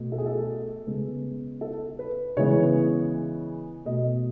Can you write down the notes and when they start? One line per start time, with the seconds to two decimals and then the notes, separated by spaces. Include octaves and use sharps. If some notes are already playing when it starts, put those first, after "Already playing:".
Already playing: B2 A3
0.12 A4
0.18 G#4
0.26 A4
0.86 C#3 G#3 B3
1.61 A4
1.99 B4
2.37 C#3 E3 G#3 B3 C#5
3.86 B2 A3 D#5